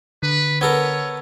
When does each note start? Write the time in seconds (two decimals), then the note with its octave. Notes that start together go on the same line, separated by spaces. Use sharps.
0.23 D3 B4
0.61 B3 A4 A#4 C#5